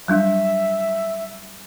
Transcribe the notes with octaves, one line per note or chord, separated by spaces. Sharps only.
F#3 G3 D4 E5